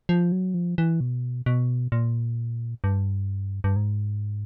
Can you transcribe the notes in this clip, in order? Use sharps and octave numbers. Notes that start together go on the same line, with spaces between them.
F3
F#3
F3
E3
B2
B2
A#2
G2
G2
G#2